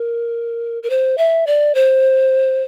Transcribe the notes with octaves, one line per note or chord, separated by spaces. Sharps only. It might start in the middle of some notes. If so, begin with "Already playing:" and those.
Already playing: A#4
A#4
C5
E5
D5
C5